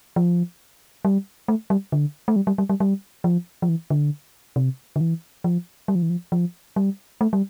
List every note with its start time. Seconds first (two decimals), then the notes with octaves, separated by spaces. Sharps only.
0.16 F3
1.05 G3
1.48 A3
1.70 G3
1.92 D3
2.28 A3
2.36 G3
2.47 G3
2.58 G3
2.70 G3
2.80 G3
3.24 F3
3.62 F3
3.69 E3
3.90 D3
4.56 C3
4.96 D3
5.01 E3
5.44 F3
5.88 G3
5.95 F3
6.02 E3
6.10 F3
6.32 F3
6.76 G3
7.21 A3
7.33 G3